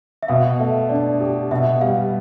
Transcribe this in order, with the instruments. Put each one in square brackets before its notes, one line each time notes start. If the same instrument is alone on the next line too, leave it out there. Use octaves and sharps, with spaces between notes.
[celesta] E5
[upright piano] B2 [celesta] F5
[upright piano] A3 [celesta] E5
[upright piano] D4 [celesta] D5
[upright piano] G4
[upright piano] B2 [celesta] E5
[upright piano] G3 [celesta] F5